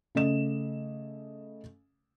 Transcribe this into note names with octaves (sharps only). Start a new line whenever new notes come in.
C#3 A3 D#5 E7